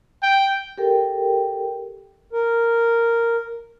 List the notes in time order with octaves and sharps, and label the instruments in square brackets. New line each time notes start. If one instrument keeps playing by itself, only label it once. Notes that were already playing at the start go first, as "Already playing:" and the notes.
[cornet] G5
[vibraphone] G4 A4 A#4 G5
[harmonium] A#4